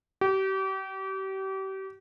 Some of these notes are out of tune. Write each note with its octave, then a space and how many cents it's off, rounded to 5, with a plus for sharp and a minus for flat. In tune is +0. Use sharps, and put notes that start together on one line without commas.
G4 -35